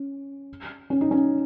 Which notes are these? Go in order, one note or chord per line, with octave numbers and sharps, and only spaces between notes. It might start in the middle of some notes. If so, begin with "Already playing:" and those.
Already playing: C#4
C#4
D#4
C#4